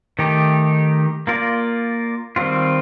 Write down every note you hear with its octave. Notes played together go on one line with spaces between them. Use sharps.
D#3 A3 D#4 G4
A#3 F4 A#4 D5
D#3 G3 C4 F4